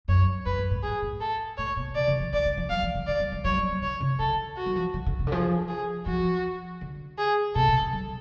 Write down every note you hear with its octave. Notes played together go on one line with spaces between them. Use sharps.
F#2 C#5
F2 B4
F#2
A2
G#4
A2
A4
A2 C#5
B2
C#3 D5
D3
F3
F3 D5
D3
F3
F#3 F5
F3
D3
D3 D5
F#3
F3
F#3 C#5
F#3
F3
D3 C#5
C#3
D3 A4
F#4
F#3
F3
D3
D3
C#3
D3
F3 G#4
G#4
F3 F#4
D3
G#4
B2 A4
C#3
D3
F#3